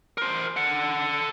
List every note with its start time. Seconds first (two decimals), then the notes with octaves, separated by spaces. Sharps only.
0.18 A#4 C5
0.57 A4 F#5